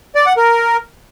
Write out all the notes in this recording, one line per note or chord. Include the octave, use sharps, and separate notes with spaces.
D5
F#5
A#4